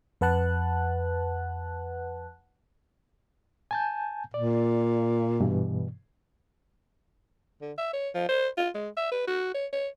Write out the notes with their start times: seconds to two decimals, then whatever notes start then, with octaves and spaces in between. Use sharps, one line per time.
0.21 F2 B4 F#5 A5 F#6
3.71 G#5 A5 G6
4.34 A#2 D5
5.40 G2 B2 E3
7.62 D3
7.78 E5
7.93 C#5
8.15 F3
8.29 C5
8.58 F4
8.75 G#3
8.97 E5
9.12 B4
9.27 F#4
9.54 C#5
9.73 C#5